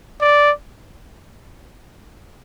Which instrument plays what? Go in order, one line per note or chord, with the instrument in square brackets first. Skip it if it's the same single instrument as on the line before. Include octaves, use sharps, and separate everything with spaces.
[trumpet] D5